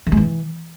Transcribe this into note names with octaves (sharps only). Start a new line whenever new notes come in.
D#3
G#3
E3